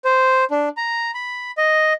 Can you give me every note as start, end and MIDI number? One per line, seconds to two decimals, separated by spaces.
0.05 0.44 72
0.51 0.69 62
0.77 1.11 82
1.14 1.51 83
1.57 1.93 75